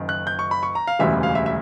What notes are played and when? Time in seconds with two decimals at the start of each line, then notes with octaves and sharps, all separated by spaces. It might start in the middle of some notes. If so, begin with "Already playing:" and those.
Already playing: F#1 F#2 D#3
0.09 F#6
0.27 G6
0.39 C#6
0.51 B5
0.63 C#6
0.75 A#5
0.87 F5
0.99 E1 D2 C#3 E3 G3 E5
1.23 F5
1.35 E5
1.46 E5